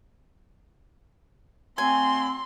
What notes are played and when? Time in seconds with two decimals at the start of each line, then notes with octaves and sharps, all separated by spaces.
1.78 F#3 A3 C4 G#5 C6